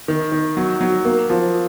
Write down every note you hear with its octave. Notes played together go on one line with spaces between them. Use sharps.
D#3
D#3
F#3
F#3
A#3
F3